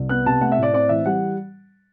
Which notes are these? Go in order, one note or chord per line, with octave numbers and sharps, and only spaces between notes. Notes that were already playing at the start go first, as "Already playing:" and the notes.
Already playing: C2
B3 F#6
C3 A5
A3 F#5
E5
A2
D5
C4 D5
E3 E5
G3 F#5